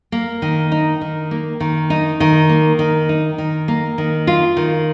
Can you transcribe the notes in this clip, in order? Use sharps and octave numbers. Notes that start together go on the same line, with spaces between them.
A#3
D#3
D#4
D#3
A#3
D#3
D#4
D#3
A#3
D#3
D#4
D#3
A#3
D#3
F4
D#3